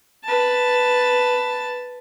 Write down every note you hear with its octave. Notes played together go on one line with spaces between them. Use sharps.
B4 A5